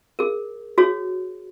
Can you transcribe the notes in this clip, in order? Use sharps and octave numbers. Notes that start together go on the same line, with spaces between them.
G#4 A#4
F#4 G#4 C#5